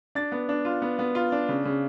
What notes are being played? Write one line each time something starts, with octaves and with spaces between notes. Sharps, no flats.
D4 A6
B3
D4
F4
B3
B3
F4
D4
C#3
C#3